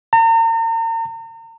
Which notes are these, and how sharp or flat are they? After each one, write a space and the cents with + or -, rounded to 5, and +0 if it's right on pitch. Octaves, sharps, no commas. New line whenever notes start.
A#5 -40